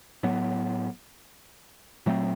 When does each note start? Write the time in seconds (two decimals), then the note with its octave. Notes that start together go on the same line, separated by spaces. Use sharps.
0.23 A2 F#3 B3
2.06 A#2 F#3 A3 C4